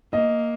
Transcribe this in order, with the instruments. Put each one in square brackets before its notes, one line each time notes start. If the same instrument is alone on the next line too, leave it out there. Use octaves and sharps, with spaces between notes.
[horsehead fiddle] A#3 [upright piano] D#5